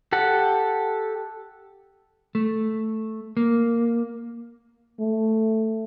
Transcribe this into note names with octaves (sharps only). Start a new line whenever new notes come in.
G4 A4 F#5
A3
A#3
A3